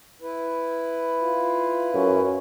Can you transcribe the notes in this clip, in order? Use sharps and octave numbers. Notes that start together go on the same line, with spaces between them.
E4 B4
F4
F#2 C#4